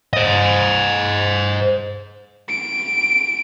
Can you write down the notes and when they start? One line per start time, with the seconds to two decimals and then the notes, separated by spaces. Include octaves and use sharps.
0.13 C5 D#5
2.49 D7